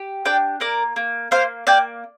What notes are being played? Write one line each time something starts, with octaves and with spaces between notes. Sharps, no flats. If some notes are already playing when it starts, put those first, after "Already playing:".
Already playing: G4
D4 D5 G5
A#3 A#4 D5
A#3
A#3 C5 F5
A#3 D5 G5